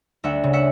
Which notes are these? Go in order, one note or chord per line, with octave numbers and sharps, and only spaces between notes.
D2 E5 F#5
C#3
E5 F#5